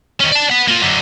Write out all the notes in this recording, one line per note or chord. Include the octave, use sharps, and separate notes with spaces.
D#3 C#4
D5 A5
B4 F#5
A#3 F4
F#2 D3